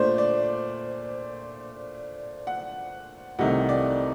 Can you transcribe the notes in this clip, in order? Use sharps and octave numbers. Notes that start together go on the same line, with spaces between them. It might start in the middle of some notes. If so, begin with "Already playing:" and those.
Already playing: A#2 A3 D4 C5 D5
D5
F#5
C2 C3 D#3 A3 D#4 F#5
D5